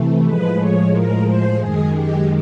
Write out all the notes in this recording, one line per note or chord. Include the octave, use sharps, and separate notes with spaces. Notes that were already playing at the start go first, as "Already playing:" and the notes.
Already playing: C3 E3 A3
A2 F3 G#3 B4
C#5
A#4
C5
F#2 D#3 G#3 G#4
G4